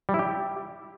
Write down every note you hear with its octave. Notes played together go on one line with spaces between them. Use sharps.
G3
E4
G4